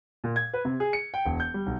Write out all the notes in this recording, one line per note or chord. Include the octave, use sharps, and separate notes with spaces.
A#2
G#6
B4
C3
G#4
C#7
G5
E1
G6
G3
B1